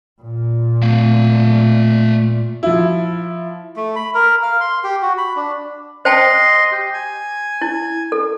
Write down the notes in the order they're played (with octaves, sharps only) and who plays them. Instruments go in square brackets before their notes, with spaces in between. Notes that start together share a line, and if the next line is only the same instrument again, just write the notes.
[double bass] A#2
[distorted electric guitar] A3 F5
[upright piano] F3 E4
[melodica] A3
B5
A#4
F5
C6
G4
F#4
B5
D4
[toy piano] C5 G5 A5 [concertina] D#5 C6
[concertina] G4
G#5
[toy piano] E4
A4